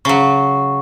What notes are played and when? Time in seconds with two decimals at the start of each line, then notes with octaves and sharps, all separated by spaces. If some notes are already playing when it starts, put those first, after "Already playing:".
0.05 C#3 F#3 C#6